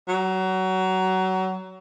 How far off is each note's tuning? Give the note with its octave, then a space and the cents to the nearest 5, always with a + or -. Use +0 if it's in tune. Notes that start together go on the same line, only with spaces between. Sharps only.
F#3 +25